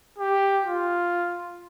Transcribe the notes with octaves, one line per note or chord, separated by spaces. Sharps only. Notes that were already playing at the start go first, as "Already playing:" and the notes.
G4
F4